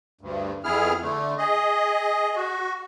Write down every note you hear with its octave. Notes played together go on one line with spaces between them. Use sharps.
D2 G2
F2 B3 E4 G#4 F6
D3 A3
G#4 D#5
F#4